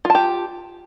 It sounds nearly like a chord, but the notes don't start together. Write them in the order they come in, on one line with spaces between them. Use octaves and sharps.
F4 A5 G4